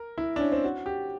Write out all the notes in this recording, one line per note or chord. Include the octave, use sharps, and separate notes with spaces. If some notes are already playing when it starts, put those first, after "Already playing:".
Already playing: A#4
E4
D4
C#4
C4
F#4
G4